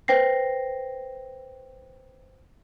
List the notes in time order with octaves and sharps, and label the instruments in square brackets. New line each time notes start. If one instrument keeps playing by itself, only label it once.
[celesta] B4 C5 G5 A#6 C7